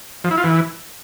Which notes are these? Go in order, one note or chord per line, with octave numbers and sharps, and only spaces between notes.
F3
E4
F4
E3